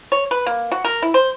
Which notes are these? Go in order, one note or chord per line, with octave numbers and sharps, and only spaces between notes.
C#5
B4
A#3
F#4
A#4
E4
C5